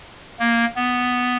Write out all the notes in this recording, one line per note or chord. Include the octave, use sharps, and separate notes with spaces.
A#3
B3